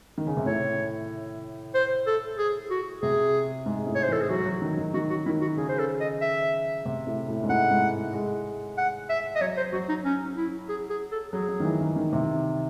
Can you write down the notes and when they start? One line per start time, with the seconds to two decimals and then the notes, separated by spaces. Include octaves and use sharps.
0.18 D#3
0.27 C#3
0.37 C3
0.46 A2 C#5
1.74 C5
2.07 A4
2.38 G#4
2.70 F#4
3.02 C3 G#4
3.66 G#2
3.87 A2
3.95 C#5
4.04 C5
4.08 E3 A4
4.21 G#4
4.30 F#3 F#4
4.46 F#3
4.62 D#3
4.78 D#3
4.94 D#3 F#4
5.10 F#4
5.26 D#3 E4
5.42 F#4
5.57 C#3 G#4
5.69 C5
5.79 A4
6.00 D#5
6.21 E5
6.85 C3
7.07 A2
7.28 A2
7.43 G#2
7.49 A2 F#5
7.71 G#2
8.13 G#3
8.78 F#5
9.09 E5
9.35 D#5
9.41 F#3 C#5
9.57 C5
9.73 F#3 F#4
9.89 D#4
10.05 C#4
10.37 E4
10.69 G#4
10.90 G#4
11.12 A4
11.33 F#3 G#4
11.49 F#3
11.60 D#3
11.65 E3
11.81 D#3
11.96 D#3
12.13 C3